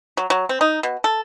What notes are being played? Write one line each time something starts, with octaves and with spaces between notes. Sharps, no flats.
F#3
F#3
C4
D#4
B2
A4